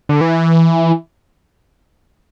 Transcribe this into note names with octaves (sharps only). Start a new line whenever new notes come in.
D3
E3